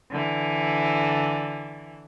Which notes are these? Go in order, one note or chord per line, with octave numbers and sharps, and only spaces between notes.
D3 E3